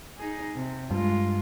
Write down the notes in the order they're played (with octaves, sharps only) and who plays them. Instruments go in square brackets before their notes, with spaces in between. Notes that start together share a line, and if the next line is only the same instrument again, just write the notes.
[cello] D#4 G#4
C3
[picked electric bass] G2 [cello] G#3 F4